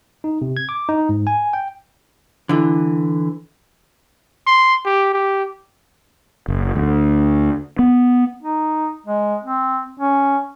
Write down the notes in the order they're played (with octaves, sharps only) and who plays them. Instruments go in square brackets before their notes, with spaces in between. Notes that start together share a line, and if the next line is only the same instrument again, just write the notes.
[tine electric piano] D#4
C3
G#6
D6
D#4
G#2
G#5
G5
[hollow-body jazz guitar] D3 E3
[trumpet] C6
G4
G4
[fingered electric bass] F#1
D2
B3
[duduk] D#4
G#3
C4
C#4